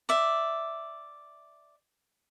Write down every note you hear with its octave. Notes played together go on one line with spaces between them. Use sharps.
D5 E5